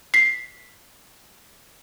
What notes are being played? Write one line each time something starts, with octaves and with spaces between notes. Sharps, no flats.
B6 C7